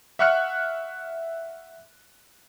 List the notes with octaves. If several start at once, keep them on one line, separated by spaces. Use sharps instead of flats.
E5 F#5 C#6 F6 F#6 C#7